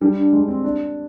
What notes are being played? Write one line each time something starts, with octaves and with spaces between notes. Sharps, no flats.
G3 D4
D4
G#3
C4
D4